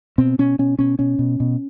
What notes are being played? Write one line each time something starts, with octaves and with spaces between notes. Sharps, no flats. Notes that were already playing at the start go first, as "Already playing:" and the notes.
B2 C4
B2 C#4
B2 C#4
B2 C#4
B2 C#4
B2
B2